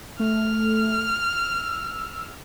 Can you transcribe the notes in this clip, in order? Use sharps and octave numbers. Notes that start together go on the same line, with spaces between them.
A3 F6
E6